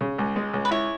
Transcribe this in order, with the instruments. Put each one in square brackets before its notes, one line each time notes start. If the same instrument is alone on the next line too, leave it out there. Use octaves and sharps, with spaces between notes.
[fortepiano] C#3
C#2
G#3
C#2
[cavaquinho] B4
[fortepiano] E4 [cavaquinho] C#5